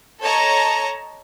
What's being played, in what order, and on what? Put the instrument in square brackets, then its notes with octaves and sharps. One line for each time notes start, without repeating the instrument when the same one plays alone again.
[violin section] A4 C#5 D#5 A5 A#5